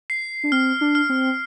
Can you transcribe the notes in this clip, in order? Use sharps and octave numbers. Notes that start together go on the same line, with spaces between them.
C7
D4
C4 F6
D4
F6
C4